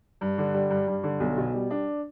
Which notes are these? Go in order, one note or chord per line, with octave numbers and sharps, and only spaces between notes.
G2
D3
G3
G2
G2
D3
B1
B2
G3
D4